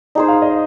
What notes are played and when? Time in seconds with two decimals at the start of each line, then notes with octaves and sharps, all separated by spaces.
0.15 D#4 G#4 C5 D#5
0.28 F5
0.42 D#5